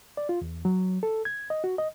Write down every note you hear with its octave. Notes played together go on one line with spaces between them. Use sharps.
D5
F4
E2
F#3
A4
G#6
D#5
F#4
D#5